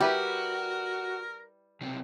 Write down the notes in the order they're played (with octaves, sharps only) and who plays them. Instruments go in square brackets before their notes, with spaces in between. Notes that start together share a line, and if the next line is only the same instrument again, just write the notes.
[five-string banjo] G3 E4 B4 [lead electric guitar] F#4 [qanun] G4 [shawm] A#4
[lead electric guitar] B1 C3